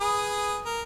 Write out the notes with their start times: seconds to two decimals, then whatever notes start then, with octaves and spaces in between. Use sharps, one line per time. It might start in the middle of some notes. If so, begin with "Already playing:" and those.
0.01 G#4 B4 D#6
0.66 A#4